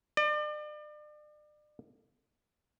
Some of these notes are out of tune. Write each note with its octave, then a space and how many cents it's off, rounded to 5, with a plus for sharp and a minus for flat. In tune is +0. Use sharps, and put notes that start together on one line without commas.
D5 +35